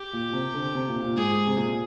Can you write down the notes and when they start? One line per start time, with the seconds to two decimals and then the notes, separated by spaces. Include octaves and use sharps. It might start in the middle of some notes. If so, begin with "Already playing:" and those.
Already playing: G4
0.13 A#2
0.33 C3
0.54 D3
0.75 C3
0.89 A#2
1.02 A#2
1.16 G#2 G#4
1.47 C3
1.57 A#2